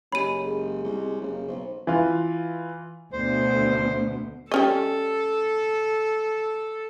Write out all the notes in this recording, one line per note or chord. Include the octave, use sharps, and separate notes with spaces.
F#1 C#4 G4 D#5 B5 D#7
G#3
C2
F#1 C#3
B1 C5
E3 F4
D2 B2 C5
G3 C#4 A4 D#5